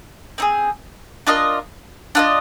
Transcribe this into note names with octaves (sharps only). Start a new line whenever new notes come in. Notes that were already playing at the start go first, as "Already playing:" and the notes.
C4 D#4 G#4
D4 F4 A#4 D#5
D4 F4 A#4 D#5